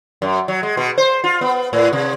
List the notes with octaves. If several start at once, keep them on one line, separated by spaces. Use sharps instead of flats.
F#2
F#3
G#3
B2
C5
F4
B3
A2
C3